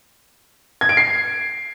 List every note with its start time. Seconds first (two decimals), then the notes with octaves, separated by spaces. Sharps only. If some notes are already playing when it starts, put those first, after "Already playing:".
0.81 G#6
0.89 D7
0.97 C7